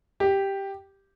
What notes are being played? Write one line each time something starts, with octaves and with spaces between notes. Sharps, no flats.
G4